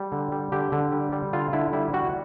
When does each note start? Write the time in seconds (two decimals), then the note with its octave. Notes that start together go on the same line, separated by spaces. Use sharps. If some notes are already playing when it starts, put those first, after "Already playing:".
Already playing: G3
0.12 D3
0.32 G3
0.52 D3 G4
0.72 D3
0.93 G3
1.12 G3
1.33 D3 F4
1.53 D3 E4
1.73 G3 E4
1.93 G3 F#4